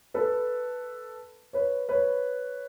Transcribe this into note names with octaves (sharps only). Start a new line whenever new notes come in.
A4 B4
B4 C#5
B4 C#5